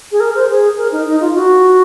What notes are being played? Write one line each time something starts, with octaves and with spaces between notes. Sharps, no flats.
G#4
A#4
C5
G#4
A#4
D#4
D#4
F4
F#4